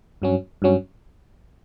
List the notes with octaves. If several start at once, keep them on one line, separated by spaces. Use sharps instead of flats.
G2 F#3 C#4
G2 F#3 C#4